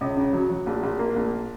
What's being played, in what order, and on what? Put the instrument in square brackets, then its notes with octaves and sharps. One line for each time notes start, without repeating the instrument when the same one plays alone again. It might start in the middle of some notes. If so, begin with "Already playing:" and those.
[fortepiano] C#2
C#3
F#3
F#3
A#1
A#1
A#3
A#1